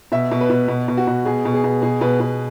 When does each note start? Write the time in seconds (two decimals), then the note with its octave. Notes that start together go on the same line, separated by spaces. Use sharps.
0.12 B2 E5
0.31 B2
0.41 B4
0.50 B2
0.68 B2
0.88 B2
0.97 F#4
1.07 B2
1.25 B2 G#4
1.45 B2
1.54 G#4
1.64 B2
1.82 B2 G#4
2.01 B2 B4
2.20 B2 B4